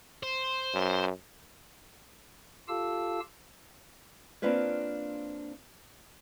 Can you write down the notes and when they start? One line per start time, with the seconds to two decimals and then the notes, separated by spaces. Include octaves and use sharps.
0.23 C5
0.74 F#2
2.68 F4 G4 A4 F5 A5 E6
4.42 A#3 C4 D4 F4 B4 C#5